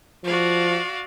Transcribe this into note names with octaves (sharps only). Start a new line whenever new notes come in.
F3 F#4 D5 F5